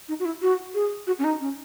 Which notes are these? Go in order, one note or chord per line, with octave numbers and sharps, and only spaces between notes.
D#4
F#4
E4
F#4
G#4
F#4
C#4
D#4
C#4